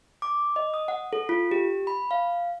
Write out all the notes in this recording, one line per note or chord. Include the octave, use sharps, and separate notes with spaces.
D6
D#5
D#6
F#5
A4
F4
G4
B5
F5